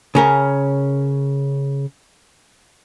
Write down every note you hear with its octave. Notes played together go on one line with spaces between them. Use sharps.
C#3 C#4 A#4